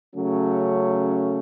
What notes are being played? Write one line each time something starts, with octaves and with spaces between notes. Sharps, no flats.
C#3 F#3 A3 C#4